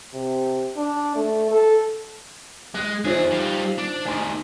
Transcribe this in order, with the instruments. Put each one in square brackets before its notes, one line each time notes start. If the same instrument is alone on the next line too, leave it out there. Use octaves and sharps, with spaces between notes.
[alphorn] C3
D4
A3
A4
[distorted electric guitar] G#3 [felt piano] F#6
[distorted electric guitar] E2 G#4 [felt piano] D#4 F4 C5
[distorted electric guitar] G3 F5
D4
[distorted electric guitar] D2 D#3 [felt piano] G#5 C6